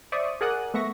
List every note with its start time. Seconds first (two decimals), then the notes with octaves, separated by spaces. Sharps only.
0.12 C5 D5 E5 C#6 D#6
0.41 G#4 A#4 D5 F#5 D#6 F#6
0.74 A3 B3 E5 C#6 A#6